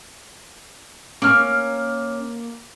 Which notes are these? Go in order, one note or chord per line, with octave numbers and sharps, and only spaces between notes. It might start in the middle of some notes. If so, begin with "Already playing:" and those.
A#3 C#4 F6